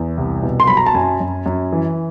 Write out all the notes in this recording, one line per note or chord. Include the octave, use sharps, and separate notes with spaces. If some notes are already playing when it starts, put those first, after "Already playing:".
Already playing: E2
C2
B2
C6
F#3 B5
A#5
A5
F#2 G#5
F#2
F#2
E3